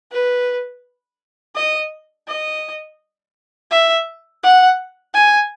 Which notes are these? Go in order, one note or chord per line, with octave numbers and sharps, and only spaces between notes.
B4
D#5
D#5
E5
F#5
G#5